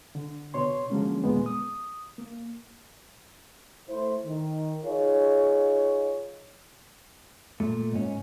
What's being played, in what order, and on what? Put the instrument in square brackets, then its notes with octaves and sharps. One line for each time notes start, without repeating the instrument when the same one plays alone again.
[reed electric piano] D3
B2 C#5 C6
D3 F3 F#3 G#3 A#3 C#4
D#2 A#2 G#3 B3
D#6
A#3
[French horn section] A3 E4 C5
D#3
D#4 F4 G#4 C#5
[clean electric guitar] A#2 A3
B1 G#2 C#4